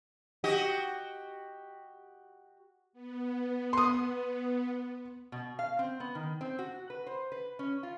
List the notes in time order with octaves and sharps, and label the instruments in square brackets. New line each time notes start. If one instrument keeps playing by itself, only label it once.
[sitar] F#4 G4 D#5
[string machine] B3
[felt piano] C6 D#6
[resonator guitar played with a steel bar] B2
F5
C4
B3
D#3
C4
F#4
B4
C5
B4
C#4
F4